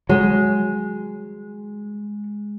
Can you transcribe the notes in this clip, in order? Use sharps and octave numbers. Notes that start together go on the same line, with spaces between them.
F#3 G#3